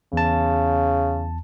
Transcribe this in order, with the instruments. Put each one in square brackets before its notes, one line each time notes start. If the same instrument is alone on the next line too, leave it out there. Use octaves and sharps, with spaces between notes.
[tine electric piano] E2 A5 [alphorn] C#3